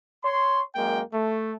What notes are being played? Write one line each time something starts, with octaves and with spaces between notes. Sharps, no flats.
C#5 C6
F#2 G#3 A#3 G5
A3